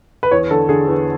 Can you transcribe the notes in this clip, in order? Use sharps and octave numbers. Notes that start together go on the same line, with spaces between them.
B4
E2 C#5
D3 A4
D3 G#4
E2